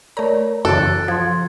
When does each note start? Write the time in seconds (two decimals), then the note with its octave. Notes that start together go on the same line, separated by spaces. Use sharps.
0.17 A3 A#4 C#5 D5 A#5
0.65 F#2 C#3 E3 A4 F#6 D7
1.08 F3 C6 G#6